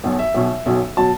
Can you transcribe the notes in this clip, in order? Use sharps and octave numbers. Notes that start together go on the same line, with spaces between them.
B1 B2 F#3
E5
B1 B2 F#3
B1 B2 F#3
B2 F#3 A5